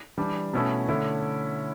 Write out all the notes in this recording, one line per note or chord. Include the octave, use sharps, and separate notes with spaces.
E3 G3 D4
B2 A3 C#4 E4
D3 A3 C#4 E4